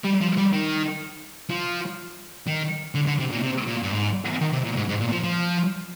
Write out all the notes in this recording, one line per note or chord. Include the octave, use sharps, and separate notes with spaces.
G3
F3
G3
D#3
F3
D#3
D3
D3
C3
A#2
C3
A#2
G2
G#2
D#3
C3
A#2
G#2
G#2
A#2
F3
F3